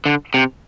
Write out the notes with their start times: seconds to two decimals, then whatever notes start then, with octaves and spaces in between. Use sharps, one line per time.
0.06 D3
0.34 C3